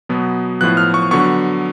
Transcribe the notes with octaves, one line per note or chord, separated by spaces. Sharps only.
B2 F#3 B3
A2 F3 B3 F#6
F6
C#6
D3 F#3 B3 C#6